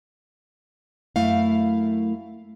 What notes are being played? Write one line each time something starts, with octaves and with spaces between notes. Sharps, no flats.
F#2 A3 E4 F5